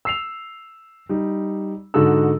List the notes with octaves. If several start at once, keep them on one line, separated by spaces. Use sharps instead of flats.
E6 C7 F7
G3 D#4
G#2 D3 D#4 F#4 A4 E6